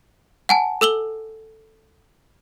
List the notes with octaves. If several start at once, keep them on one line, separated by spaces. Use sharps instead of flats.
F#5 G#5 A5
A4 E6 F#7 G7